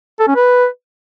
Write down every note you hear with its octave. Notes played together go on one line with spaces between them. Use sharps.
A4
C#4
B4